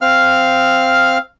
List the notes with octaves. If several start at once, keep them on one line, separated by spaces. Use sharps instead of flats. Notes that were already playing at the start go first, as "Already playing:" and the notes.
C4 F5 F6